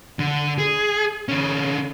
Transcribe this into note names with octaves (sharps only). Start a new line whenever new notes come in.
D3
G#4
D3 C#4